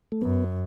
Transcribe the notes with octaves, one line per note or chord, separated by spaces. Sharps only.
A3
F#2 B3